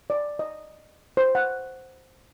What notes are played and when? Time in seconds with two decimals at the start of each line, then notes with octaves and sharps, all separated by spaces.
0.10 D5
0.39 D#5
1.17 C5
1.35 F#5